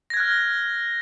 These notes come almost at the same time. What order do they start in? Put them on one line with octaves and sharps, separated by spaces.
A#6 G#6 F#6 F6